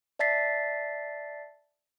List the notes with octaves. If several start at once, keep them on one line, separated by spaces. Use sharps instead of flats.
D5 E5 A5 A6 B6 C7